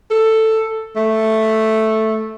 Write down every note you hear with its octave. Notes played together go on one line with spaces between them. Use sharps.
A4
A3